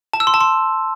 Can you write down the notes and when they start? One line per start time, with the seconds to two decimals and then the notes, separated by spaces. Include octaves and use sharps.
0.13 A5
0.20 E6
0.27 C6
0.34 A5
0.41 C6